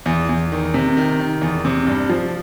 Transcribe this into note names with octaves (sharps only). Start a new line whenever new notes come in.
E2
E2
D#3
C3
D#3
D#3
E2
C3
G2
F3